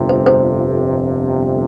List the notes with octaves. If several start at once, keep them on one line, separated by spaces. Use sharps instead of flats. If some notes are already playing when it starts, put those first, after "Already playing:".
Already playing: G1 F2 C3
C5
C5